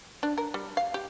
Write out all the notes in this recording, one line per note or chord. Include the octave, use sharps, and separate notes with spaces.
D4
A#4
G3
F5
G4